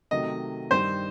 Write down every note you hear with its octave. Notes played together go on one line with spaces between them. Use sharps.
C3 D#3 F#3 A3 D#5
G2 D#3 G3 D#4 C5